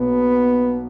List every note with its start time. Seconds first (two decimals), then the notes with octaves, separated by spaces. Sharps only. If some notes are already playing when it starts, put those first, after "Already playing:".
Already playing: B1 B2 A#3 B3